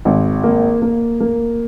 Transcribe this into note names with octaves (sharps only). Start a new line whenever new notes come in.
G#1
A#3
A#3
A#3